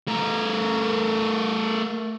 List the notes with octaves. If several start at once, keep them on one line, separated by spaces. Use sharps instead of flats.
A3 A#4